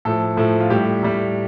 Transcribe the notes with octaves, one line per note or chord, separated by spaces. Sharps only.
A2 F3 A4
A2 F3
F4
A2 G3 G4
A2 G3